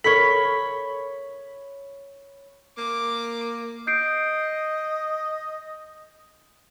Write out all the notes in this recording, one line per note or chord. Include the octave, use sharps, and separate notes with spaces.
A4 A#4 C#5 B5 B6
A#3 D6
D#5 G6 C7 D7